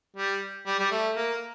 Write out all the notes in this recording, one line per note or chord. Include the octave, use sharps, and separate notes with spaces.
G3
G3
G3
A3
A#3